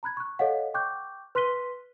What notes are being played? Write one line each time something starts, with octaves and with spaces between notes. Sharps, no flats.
A#5 B5 F#6 G#6
C#6 F#6
A4 C#5 D#5 F5 F#5
G5 C#6 D6 F#6 G6
B4 C6 F#6 B6 D#7 G7